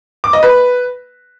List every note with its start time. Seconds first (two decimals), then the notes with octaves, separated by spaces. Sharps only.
0.24 D6
0.33 D#5
0.43 B4